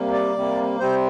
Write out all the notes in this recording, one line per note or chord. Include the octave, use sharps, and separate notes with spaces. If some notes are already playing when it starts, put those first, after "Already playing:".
Already playing: C3 G3 A#3
D5
C3 G3 A#3
C3 G3 C4 C5